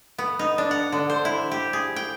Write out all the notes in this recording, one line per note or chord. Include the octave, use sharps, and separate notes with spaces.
B3
D#4
D4
F#5
D3
C5
E4
G4
G#4
G5